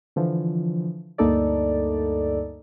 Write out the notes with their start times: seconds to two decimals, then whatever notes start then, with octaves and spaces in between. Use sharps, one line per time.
0.16 D3 E3 F3
1.18 D2 G2 A#3 D#4 A4 D5